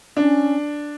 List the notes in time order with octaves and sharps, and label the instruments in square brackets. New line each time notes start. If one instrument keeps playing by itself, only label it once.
[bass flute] C#4 [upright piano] D4